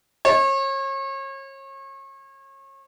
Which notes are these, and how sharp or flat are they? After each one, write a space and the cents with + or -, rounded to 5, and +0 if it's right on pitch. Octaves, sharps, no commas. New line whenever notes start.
C#5 -35